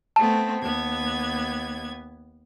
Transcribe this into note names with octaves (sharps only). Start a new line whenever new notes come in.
A3 B3 C4 A5
D#2 B3 G#6